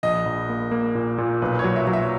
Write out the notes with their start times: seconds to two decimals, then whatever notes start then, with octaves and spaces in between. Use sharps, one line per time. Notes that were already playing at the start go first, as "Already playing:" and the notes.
0.03 A#1 D#5
0.26 A#1
0.50 A#3
0.71 A#3
0.95 A#2
1.18 A#2
1.42 B1 B4
1.59 C#5
1.64 F#3
1.76 E5
1.87 F#3
1.93 E5